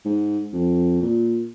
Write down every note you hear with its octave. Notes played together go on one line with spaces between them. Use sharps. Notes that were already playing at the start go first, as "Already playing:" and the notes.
G#2
F2
A#2